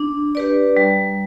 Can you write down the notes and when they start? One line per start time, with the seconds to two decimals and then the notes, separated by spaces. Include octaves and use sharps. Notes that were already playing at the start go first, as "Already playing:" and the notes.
Already playing: D4
0.35 G4 B4 D5
0.77 G3